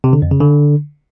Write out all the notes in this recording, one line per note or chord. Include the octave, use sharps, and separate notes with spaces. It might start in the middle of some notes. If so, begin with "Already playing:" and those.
C3
D3
F2
C#3
D3